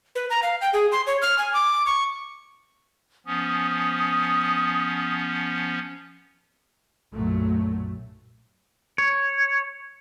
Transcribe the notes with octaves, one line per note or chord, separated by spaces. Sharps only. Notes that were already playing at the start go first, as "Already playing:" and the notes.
B4
A#5
F5
G5
G#4
C6
C#5
F6
G#5
D6
C#6
F3 B3 C#4 D#6
B1 F#2 A#2 F#3 A3
C#5